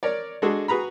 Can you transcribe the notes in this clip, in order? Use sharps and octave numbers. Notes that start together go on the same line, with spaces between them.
A#4 C#5 D5
G#3 D4 F#4 G#4 A4
F#4 G#4 B4 A#5 B5